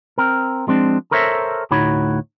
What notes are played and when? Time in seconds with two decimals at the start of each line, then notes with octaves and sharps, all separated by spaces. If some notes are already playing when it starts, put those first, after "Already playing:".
0.18 C4 A#4
0.67 F3 G#3 C4 D4
1.11 A4 A#4 C5 C#5 E5
1.71 D2 A2 D#4 F#4 C#5 B5